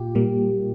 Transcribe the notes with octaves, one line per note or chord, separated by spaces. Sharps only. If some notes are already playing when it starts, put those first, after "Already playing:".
Already playing: A#2 F4 G4
A#2 G3 A#3